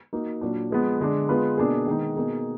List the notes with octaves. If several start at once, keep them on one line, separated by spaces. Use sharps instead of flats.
A#3 D#4 F#4
A#2 F#3 D4
F3 G#3 B3
D3 G#3 D4
G#3 B3 F4 B4
B2 A#3 D4 G#4
D#3 G#3 B3 D#4
B2 A#3 D#4 G#4